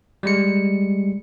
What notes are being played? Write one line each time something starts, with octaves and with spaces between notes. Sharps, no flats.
G3 G#3 C#7